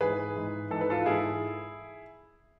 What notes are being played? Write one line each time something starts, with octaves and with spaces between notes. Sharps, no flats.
G#2 E3 G#4 B4
G#2 E3
G#2 E3 A4
B4
F4 A4
G#2 E3 E4 G#4